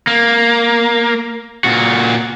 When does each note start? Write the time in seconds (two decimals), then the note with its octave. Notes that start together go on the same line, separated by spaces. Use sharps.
0.07 A#3
1.64 A#2 F#4